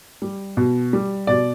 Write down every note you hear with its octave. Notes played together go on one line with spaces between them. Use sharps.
G3
B2
G3
B2 D5